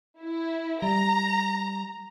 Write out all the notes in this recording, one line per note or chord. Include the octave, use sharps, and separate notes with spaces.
E4
G3 A#5